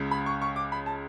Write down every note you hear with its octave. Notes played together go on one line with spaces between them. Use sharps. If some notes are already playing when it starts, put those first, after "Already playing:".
Already playing: C#2 C#3
B5
C#6
C#6
D6
B5
A5